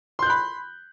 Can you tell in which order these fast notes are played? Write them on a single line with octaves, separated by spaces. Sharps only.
C6 G6 F#6 B5